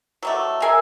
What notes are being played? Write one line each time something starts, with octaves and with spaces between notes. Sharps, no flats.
F#3 G3 A3
G#4 A#4 E5 G#5